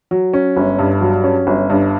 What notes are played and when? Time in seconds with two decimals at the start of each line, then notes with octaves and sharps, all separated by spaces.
0.11 F#3
0.33 C#4
0.57 G1
0.79 G2
1.01 F#3
1.24 C#4
1.47 G1
1.70 G2